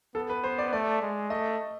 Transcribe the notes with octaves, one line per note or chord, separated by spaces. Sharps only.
B3 A4
B4
C5
D5
A3 D5
G#3
A3 D#5